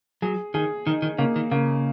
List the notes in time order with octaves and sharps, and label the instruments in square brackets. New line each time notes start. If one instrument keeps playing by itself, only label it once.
[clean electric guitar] F#3 [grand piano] G#4
[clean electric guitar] D#3 [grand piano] G#4
[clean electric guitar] D#3 [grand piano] D#4
[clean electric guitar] D#3
[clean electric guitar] C#3 [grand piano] A#3
[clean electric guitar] D#3
[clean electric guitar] C#3 [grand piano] A#3